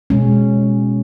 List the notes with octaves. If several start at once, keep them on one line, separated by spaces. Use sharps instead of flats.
B2 G#3 C#4